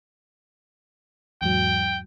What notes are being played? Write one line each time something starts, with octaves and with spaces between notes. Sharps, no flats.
E2 G#2 F#3 G5